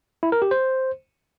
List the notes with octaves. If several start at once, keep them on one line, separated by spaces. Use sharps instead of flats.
E4
A#4
G4
C5